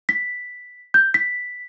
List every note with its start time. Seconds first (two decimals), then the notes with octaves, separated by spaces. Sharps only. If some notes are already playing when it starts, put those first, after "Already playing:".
0.09 B6
0.94 G6
1.14 B6